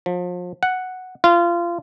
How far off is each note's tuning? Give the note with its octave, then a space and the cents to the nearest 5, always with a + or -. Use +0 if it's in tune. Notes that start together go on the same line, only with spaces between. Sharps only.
F3 +35
F#5 +0
F4 -25